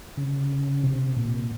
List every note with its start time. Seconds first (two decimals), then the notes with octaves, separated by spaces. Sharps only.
0.17 C#3
0.83 C3
1.16 A#2